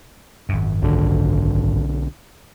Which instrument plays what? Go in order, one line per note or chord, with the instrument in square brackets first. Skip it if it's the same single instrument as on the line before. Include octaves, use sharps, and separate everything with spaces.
[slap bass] G#1 F#2
[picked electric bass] B1 D3